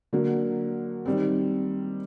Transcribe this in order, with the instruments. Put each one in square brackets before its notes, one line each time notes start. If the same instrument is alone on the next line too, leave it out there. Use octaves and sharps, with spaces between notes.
[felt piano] D3 F#3 A#3 F#4
D#3 G3 C4